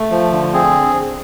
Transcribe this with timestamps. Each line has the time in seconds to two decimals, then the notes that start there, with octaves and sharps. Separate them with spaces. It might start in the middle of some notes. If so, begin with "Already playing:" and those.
Already playing: A3
0.11 F3
0.32 D3
0.53 C4 G#4